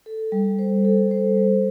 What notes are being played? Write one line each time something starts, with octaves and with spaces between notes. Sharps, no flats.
A4
G3
C5
A4
C5
G3